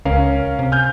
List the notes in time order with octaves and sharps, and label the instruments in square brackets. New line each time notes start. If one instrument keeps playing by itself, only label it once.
[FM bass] C#2 [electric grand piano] C#4 A#4 F5
[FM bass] C3
[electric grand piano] G#5 F6 G6